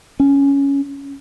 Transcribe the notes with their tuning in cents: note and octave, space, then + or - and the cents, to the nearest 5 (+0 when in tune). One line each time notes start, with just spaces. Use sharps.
C#4 +5